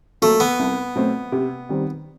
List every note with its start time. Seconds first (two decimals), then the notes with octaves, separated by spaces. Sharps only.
0.22 F#3 A3 A#3
0.40 B3
0.59 C2
0.96 B2 F#3 A3 C4
1.32 C3
1.69 D#3 G3 C4